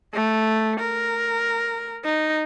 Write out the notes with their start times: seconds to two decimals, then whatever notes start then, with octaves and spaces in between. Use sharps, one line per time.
0.14 A3
0.80 A#4
2.05 D#4